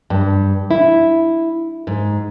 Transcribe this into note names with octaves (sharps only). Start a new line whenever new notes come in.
G2
E4
G#2